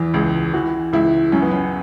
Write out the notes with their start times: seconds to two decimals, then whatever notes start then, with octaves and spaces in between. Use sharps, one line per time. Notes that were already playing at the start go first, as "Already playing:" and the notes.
Already playing: E2 E3
0.14 C#2
0.53 E3 F#4
0.93 C#2 E4
1.32 F#2 C#4
1.42 B3
1.51 C#4